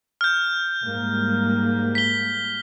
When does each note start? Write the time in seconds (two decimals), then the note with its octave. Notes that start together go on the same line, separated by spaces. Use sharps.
0.21 F6 G6
0.83 G#2 G3 A#3
1.95 B6 G7